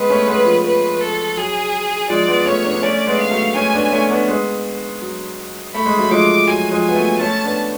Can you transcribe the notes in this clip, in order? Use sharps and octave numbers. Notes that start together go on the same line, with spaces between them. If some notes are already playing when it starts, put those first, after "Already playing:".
Already playing: G#3 B3 B4
A3 C#4
G#3 B3
F3
B4
A4
F#3 G#4
F3 G#3 D5
G#3 B3
A3 C#4 C#5
B3 D4
D4
A3 C#4 D5
G#3 B3
F5
F#3 A3
A3 C#4 G#5
B3 D4
A3 C#4
B3 D4
G#3 B3
F#3
A3 B5
G#3
F#3 A3
F3 G#3 D6
F#3 G#5
F3 G#3
B3 G#5
F#3 A3
A3 C#4 A5
B3 D4